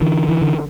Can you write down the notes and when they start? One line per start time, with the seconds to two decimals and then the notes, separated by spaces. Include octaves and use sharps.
0.01 D3 E3
0.29 E3
0.42 D3